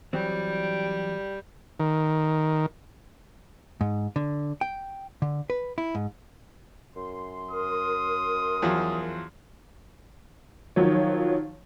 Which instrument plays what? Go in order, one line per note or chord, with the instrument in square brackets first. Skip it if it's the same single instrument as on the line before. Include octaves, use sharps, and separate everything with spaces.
[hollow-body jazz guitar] E3 F#3 C4 [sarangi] G3
[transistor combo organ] D#3
[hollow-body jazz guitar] G#2
D3
G5
D3
B4
E4
G#2
[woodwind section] F#2 C6
[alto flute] A#4 [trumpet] D#6
[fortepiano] E2 F3 F#3
[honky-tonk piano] D#3 F3 F#3 C#5